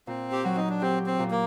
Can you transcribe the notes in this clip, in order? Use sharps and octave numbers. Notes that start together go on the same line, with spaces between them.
A#2 C4
G4
F#3 F#4
D#4
D4
C4 G4
C4
A#2
A#3